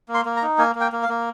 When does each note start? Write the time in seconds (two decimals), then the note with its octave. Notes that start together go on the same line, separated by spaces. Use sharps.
0.08 A#3
0.14 C6
0.25 A#3
0.37 A#5
0.42 D#4
0.58 A#3 G#5
0.75 A#3
0.81 G5
0.92 A#3
1.03 F5
1.09 A#3